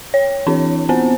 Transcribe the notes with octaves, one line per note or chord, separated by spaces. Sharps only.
C#5
E3 C4 D4 E4
B3 C4 C5